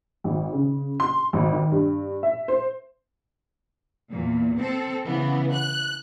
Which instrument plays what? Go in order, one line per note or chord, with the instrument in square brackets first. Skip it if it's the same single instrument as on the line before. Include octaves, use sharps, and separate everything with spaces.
[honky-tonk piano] G#1
C#3
C6
G#1
D#3
G2
E5
C5
[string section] E2 A#2
C4 A4
C#3 E3 B3
F#6